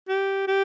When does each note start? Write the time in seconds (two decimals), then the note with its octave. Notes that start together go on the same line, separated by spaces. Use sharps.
0.09 G4
0.48 G4